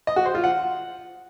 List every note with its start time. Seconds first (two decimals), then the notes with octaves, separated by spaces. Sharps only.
0.07 D#5
0.16 F#4
0.25 C5
0.35 F4
0.44 F#5